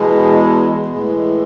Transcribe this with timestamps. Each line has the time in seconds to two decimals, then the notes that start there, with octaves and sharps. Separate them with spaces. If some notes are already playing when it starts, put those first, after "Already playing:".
Already playing: E2 B2 G#3
0.86 A2 E3 G#3